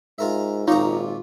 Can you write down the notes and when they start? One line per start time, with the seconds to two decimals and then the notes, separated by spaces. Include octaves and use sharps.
0.18 G#2 F4 A#4 E5
0.67 G#1 A#2 D#4 F4 G4 C#5 A#5